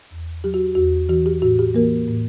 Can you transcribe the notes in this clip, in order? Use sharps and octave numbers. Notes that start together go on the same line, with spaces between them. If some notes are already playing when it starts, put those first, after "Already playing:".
E2
F#3 G4
F#4
E2 F#4
E3 F#4
G4
A2 F#4
G4
E3 A#3 A#4
A2